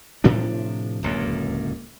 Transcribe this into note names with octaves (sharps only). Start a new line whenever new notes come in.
A2 C3 F3 D4
D1 C#2 F#2 A#3